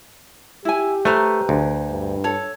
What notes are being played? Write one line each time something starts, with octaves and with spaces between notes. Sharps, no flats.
E4 G4 G#5
A3 B4 C5 A#5
D2
G2
A4 C#5